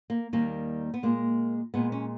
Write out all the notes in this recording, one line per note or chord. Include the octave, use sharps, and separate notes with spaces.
A#3
D#2 D#3 G3 A#3
B3
A#2 G#3 A#3
A#2 G#3 B3
C#4